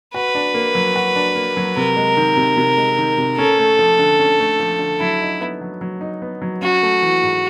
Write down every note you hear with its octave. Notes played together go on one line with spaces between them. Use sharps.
F#4 B4
D4
A#3
F#3
F#4
D4
A#3
F#3
C3 A#4
G#3
D#3
C3
C3
G#3
D#3
C3
C#4 A4
A3
F3
D3
C#4
A3
F3
D3
F#3 E4
D#4
B3
F#3
F#3
D#4
B3
F#3
C#4 F#4
A3
E3
G#2